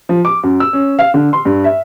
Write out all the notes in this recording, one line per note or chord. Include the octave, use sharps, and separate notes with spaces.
F3
D6
F#2
E6
C#4
F5
D3
C6
G2
E5